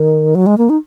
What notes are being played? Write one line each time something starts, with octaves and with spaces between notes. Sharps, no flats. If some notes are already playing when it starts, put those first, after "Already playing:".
Already playing: D#3
F#3
G#3
A#3
D#4